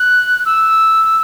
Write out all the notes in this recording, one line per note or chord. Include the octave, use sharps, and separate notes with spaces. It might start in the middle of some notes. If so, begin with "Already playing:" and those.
Already playing: F#6
E6